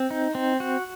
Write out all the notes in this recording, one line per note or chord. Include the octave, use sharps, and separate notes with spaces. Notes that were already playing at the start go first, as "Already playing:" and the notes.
Already playing: C4
D#4
C4
F#4